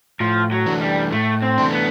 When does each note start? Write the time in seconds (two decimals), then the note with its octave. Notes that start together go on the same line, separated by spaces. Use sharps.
0.20 A2 F3
0.52 F#3
0.66 E3 A3 D4
0.81 G3
1.12 A2 A3
1.42 C4
1.58 E3 A3 D4
1.72 B3